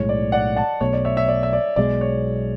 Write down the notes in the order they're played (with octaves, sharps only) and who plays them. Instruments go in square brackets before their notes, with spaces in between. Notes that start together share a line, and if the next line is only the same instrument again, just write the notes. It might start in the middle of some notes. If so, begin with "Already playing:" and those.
Already playing: [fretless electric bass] B1 A2 G#3 [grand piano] C#5
[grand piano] D5
D5 F#5
F#5 A5
[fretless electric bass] B1 B2 A3 [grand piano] C#5
[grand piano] D5
C#5 E5
C#5 E5
D5
E5
D5
[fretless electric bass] B1 B2 G#3 [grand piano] D5
[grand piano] C#5